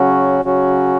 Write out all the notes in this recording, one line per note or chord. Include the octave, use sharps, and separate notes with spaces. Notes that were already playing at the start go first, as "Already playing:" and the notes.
Already playing: C#3 F#3 C#4 F#4
C#3 F#3 C#4 F#4